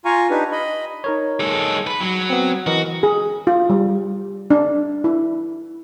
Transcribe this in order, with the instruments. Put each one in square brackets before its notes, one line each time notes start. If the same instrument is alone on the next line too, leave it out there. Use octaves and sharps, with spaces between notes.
[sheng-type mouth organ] F4 F5 G#5 A#5 C#6
D4 D#4 G4 B4
D#5 B5
[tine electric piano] D#4 A#4 C#5
[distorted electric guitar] G#3 A4
B4
F#3
[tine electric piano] B3 C4
[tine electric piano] E3 A#4 D#5 [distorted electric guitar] F#4
[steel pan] G#4
F4
G3
D4
E4